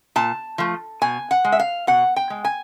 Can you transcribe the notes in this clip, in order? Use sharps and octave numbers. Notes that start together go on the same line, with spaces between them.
A#2 A5
F3 A3
B2 G#5
F#5
G#3
E5
F5
B2 F#5
G5
G#3
G#5